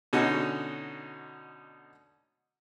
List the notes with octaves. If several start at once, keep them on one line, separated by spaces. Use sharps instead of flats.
B2 D3 C#4 D#4 F#4